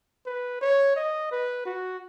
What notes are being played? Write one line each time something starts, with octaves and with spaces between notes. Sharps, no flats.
B4
C#5
D#5
B4
F#4